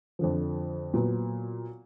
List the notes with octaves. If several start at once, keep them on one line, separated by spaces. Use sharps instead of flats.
F2 D3 F3
A#2 F#3 B3